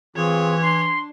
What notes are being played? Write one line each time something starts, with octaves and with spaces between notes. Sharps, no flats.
E3 C4 F4 G#4 C#5
D4 C6